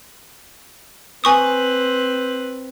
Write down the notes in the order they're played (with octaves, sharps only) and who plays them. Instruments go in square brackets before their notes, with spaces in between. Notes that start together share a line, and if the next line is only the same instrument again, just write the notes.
[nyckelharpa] C4 B4 [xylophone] G#5 C#6 D#6